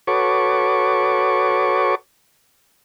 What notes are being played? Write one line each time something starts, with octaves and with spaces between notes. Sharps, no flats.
F#4 A4 B4 C#5 C#6 D6